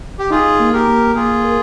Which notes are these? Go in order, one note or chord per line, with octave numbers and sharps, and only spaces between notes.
G4
D#4 F4 G#4
A#3
G4 A#4
A#3
A#3 F4 G#4
A#4